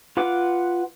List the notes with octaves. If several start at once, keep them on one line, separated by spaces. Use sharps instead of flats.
F4 B4 F#5 D6